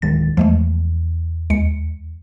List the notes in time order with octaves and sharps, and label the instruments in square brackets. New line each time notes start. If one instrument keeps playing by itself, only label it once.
[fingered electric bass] D1 D#3 G#3 [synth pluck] A6
[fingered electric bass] E2 [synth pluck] F3 G#3 A3
[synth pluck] D#2 G#3 C#7